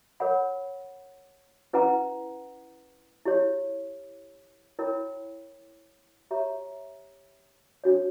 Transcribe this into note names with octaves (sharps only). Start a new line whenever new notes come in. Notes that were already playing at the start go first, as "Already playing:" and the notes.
A#4 C#5 F#5 B5
C#4 E4 B4 F#5 A#5
E4 G4 C#5
E4 A#4 C#5 G5 B5
G4 C#5 E5 A#5
D4 F#4 C#5